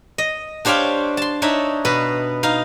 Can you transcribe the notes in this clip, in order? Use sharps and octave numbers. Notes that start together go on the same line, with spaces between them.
D#5
D4 G4 C5 C#5 F5 G5
A5 C6
D4 D#4 C#5 E5
B2 B4
D#4 F5